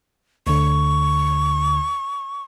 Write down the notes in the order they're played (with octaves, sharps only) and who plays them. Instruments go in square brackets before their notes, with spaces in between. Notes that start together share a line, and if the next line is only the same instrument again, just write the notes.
[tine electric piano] D2 D3 [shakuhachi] C#6